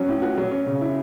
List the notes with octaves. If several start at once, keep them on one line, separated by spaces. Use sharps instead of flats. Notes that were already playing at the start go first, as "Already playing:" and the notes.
Already playing: F#3 C#4 F#4
A2
F#4
F#3
C#4
C#3
E4